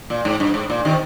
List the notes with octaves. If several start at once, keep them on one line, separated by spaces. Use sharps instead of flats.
A#2
G#2
G2
G#2
A#2
C3 D#3